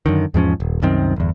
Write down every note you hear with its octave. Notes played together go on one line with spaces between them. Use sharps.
F#2 D3 D#3
E2 G#2 F3 C#4
D#1
C2 F#2 D#3 C4
G1 E2